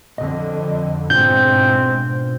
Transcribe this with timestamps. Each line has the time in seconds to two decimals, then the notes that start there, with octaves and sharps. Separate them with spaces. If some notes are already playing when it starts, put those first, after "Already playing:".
0.18 F2 D3 D#5
1.10 G#2 B2 C4 D4 F4 G6